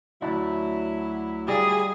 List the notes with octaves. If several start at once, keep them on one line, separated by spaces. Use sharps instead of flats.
D2 F#3 D4 E4
G3 F4 G#4 D5 D#5